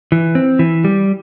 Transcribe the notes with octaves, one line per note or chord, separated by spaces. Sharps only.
E3
C4
E3
G3